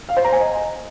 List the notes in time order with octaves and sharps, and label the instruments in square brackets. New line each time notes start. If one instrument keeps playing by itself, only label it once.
[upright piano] F5
C5
A#5
G#5
D#5